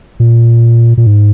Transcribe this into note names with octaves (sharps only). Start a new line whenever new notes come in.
A#2
A#2
G#2